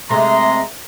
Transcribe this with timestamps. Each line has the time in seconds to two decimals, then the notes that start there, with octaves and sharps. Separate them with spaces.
0.10 C3 G#3 A3 A#5 C6